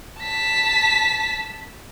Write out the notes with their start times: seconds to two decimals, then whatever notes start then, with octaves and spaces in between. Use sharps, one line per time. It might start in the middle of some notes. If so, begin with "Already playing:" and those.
0.21 A5 B6